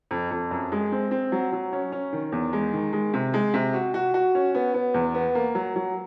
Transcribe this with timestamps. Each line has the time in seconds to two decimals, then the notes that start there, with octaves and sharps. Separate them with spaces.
0.11 F2
0.31 F2
0.51 F#2
0.72 G#3
0.92 C4
1.11 C4
1.32 F#3
1.52 F#3
1.73 C#4
1.92 C#4
2.13 D#3
2.32 E2
2.53 G#3
2.73 D#3
2.93 G#3
3.14 C3
3.34 G#3
3.54 C3
3.74 F#4
3.94 F#4
4.14 F#4
4.35 C#4
4.55 B3
4.74 B3
4.94 E2
5.14 B3
5.35 A#3
5.55 F#3
5.76 F#3